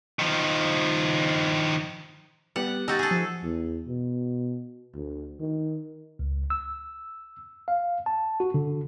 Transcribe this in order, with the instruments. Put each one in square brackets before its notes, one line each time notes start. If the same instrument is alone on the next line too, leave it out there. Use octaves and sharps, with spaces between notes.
[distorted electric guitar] D#3 F3
[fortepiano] G3 B3 G4 [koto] F#5
[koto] D#4 F#4 [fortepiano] G4 [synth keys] E6 G6 A6
[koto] G#4 A4
[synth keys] F3
[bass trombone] E2
B2
D2
D#3
[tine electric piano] C#2
E6
F5
A5
F#4
D3